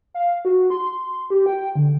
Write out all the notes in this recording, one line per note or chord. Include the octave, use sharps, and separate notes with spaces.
F5
F#4
C6
G4
G5
D3